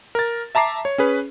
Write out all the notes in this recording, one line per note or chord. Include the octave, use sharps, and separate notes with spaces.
A#4 A6
E5 A5 A#5 D6 C7
C#5
C#4 G#4 B4